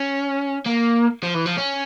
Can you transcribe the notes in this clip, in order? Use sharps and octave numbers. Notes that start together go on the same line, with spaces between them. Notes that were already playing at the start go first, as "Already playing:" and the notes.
Already playing: C#4
A#3
F3
E3
F3
C#4